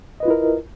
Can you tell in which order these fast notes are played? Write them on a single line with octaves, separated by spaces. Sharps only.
D#5 B4 F4 E4 A#4